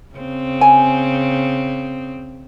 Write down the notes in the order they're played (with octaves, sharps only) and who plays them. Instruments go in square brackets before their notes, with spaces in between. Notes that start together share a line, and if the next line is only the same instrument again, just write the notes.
[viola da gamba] C#3 C4
[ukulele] G#5